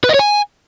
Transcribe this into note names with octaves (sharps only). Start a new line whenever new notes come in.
B4
D#5
C#5
G#5